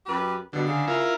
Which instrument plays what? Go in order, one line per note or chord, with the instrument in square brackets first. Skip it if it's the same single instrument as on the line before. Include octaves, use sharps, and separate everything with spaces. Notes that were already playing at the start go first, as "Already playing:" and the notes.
[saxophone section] F#2 G4 B4
[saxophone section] G2 B2 [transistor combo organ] D3
[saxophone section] C#3
[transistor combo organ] E4 F4 A#4